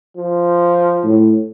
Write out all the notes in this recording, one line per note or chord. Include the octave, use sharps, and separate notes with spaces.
F3
A2